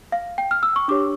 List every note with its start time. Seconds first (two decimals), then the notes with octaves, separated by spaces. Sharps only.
0.12 F5
0.38 G5
0.51 F6
0.63 E6
0.76 C#6
0.88 D4 G4 C#5 D6